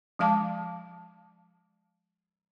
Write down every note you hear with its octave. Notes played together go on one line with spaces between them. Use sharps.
F3 G#3 F5 A5 D6